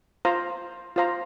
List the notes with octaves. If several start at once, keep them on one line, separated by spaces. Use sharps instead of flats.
F4 C5 F5 A#5
F4 C5 F5 A#5